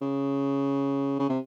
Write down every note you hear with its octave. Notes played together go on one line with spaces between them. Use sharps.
C#3
C#3
C3